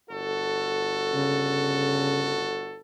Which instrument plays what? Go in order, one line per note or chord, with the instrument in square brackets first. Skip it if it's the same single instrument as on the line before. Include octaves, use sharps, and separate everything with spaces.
[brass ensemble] G1 F#4 A4
[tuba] C#3